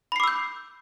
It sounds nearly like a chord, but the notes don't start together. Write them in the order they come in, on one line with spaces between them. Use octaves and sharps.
B5 C7 D6 E6 G6